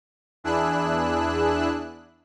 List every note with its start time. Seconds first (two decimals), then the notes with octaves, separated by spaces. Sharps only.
0.44 E2 D4 E4 G#4 E6 F#6